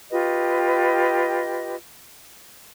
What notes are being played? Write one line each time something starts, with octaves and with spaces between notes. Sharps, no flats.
F4 G4 B4 D#5